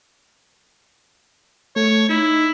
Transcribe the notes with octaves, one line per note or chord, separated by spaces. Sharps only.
A3 C#5
D#4 E4